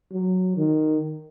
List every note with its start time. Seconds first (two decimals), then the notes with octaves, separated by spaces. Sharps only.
0.12 F#3
0.57 D#3